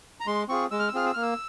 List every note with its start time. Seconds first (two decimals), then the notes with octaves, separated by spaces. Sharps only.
0.20 A#5
0.26 G#3 C6
0.49 C4 F4 G#4 C#6
0.71 G#3 E6
0.79 F6
0.88 E6
0.94 C4 F4 G#4 F6
1.06 E6
1.14 A#3 F6
1.22 E6